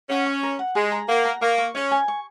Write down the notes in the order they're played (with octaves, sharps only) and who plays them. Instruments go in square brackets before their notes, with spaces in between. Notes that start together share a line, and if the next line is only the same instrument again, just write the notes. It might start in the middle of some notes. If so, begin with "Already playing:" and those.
[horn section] C#4 [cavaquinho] F#5
[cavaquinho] C#6
A#4
F#5
[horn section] G#3 [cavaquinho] G#4
[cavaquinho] A#5
[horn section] A#3 [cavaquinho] F#5
[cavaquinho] A#5
[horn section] A#3 [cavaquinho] C#6
[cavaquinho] C#6
[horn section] C#4 [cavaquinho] C#5
[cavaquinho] G#5
C#6